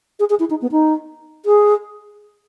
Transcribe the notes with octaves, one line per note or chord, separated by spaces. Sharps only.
G#4
G#4
E4
D#4
B3
D#4
G#4